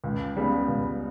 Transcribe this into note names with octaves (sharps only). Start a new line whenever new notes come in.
C#2
C#3 G3 B3
C#2